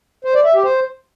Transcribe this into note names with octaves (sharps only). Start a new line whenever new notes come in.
C5
D5
E5
G4
C5